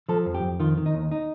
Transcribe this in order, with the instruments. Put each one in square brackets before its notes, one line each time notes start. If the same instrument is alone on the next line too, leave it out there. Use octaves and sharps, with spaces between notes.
[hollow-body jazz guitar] F3 A4
F2
G4
F2
D#3 F4
D#3
D#4
D#2
D#4